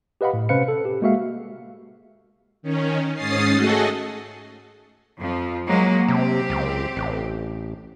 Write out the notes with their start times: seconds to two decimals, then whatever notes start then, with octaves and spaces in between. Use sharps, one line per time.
0.21 G4 B4 D#5 F5 F#5 B5
0.33 A2
0.49 C3 C#4 B4 C5 F5 C#7
0.68 A4
0.85 G4
1.02 G#3 A#3 F#4 E5 F5
2.62 D#3 C#4
3.15 G#2 C#4 D#6 A6 C7
3.54 A3 F#4 G#4 A4 D#5
5.18 F2 F3
5.67 F#3 G#3 A#3
6.08 C3 C4 G4
6.50 C#2
6.96 A1